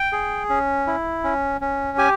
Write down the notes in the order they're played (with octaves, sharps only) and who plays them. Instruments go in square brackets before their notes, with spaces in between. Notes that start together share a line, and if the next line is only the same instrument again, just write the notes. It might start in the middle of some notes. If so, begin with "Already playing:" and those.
Already playing: [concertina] G5
G#4
C#4
E4
C#4
C#4
G4 G#5